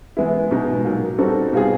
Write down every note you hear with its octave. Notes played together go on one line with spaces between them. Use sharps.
E3 G#3 B3 E4
B2 G#3 B3 D#4
A#2 F#3 A#3
G3 C4 D#4 F#4 A4
B2 G3 C4 F4 G#4